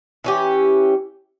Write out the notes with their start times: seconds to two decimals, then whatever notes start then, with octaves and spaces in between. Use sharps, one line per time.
0.24 E3 C#4 G4